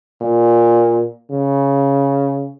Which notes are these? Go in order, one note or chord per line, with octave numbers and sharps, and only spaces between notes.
A#2
C#3